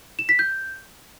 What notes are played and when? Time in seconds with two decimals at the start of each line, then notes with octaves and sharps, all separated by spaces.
0.19 E7
0.29 B6
0.39 G6